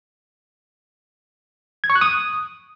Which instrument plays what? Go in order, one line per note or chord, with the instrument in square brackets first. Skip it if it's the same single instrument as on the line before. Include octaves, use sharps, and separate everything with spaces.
[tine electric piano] G#6
C#6
F#6
D#6